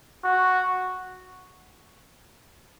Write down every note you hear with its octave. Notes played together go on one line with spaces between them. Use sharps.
F#4